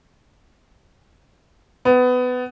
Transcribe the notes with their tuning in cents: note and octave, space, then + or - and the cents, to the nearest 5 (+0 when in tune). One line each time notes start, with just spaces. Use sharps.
B3 +20